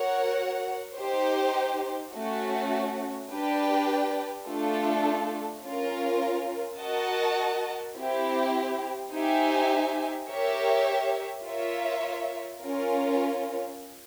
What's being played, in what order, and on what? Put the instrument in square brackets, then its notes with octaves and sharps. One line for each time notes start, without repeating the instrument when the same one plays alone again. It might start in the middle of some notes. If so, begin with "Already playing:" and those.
Already playing: [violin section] F#4 A#4 C#5 F#5
D#4 G4 C5
A3 C#4 F#4
D4 G4 B4 D5 G5
A3 D4 F4 A4
C#4 F4 A#4
F#4 A#4 D#5 F#5 A5
C4 E4 G4
D#4 G4 C5 E5 G#5
G4 A#4 C#5 E5
F4 A#4 C#5 E5
C#4 F4 A#4